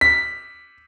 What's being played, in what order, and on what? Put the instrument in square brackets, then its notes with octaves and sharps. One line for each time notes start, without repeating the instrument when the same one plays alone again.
[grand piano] B6